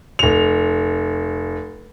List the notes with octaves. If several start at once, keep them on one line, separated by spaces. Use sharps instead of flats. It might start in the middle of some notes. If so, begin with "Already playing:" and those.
F1 F7